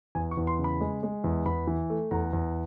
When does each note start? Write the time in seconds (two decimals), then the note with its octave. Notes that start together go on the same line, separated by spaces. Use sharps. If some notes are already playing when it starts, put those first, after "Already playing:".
0.15 E2 G#5
0.31 C#6
0.37 E2
0.47 C6
0.59 C#3
0.64 B5
0.81 G#3
1.03 G#3
1.24 E2
1.46 E2 B5
1.67 E3
1.90 A3
2.11 E2 A#5
2.33 E2